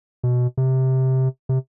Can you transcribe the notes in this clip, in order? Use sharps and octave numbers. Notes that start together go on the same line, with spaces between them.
B2
C3
C3